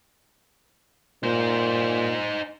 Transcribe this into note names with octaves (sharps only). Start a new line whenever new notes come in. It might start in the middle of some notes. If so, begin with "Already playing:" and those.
A#2 D#4 C5